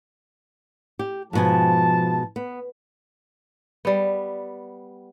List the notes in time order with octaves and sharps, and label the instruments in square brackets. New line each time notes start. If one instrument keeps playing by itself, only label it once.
[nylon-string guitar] G4
[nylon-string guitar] G#2 B2 G#5 [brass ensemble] F3 A5
[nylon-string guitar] B3
[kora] G3 B3